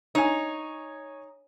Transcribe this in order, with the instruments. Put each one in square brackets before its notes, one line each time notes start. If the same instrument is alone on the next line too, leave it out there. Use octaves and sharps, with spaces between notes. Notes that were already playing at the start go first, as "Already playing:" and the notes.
[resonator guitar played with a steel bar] D#4 [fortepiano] C#5 G#5